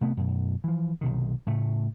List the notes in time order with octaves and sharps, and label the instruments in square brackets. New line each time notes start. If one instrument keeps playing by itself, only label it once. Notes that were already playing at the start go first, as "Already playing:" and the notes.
[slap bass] C3 A3 B3
F#2 B2
E3 F3
B1 C3 D#3
A2 C#3 A3